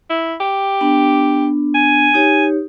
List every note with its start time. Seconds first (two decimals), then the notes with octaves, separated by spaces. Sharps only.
0.10 E4
0.40 G4
0.81 B3 D4
1.75 G#5
2.14 D#4 G4 C#5